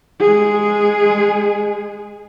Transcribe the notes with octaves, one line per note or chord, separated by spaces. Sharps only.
G#3 G#4